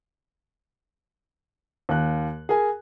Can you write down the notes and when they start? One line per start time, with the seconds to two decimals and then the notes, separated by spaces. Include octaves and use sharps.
1.89 D#2 F#6
2.49 G#4 A#4 G#5